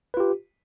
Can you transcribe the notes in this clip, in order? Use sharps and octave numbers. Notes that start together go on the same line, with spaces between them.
F4 G4 B4